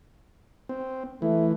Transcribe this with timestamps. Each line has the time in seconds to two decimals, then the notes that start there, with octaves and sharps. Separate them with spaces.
0.69 C4
1.22 E3 A3